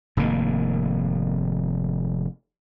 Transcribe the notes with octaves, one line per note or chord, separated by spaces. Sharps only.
F1 G#2 D#3 A#3